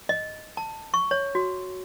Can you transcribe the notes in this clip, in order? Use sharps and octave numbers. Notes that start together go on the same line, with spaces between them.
D#5
A5
C#6
C#5
F#4